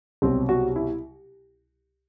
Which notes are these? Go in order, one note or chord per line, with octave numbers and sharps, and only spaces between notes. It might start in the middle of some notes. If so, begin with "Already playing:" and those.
C2 B2 F#3 C4
F#4
E4